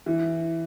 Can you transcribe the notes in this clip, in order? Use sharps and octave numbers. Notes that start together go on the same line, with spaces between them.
E3